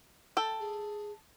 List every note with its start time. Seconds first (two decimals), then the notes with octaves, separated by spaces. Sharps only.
0.37 A4 G5
0.60 G#4